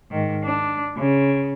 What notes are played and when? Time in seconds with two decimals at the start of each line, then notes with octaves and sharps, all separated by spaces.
0.11 G#2 D#3
0.44 D4
0.97 C#3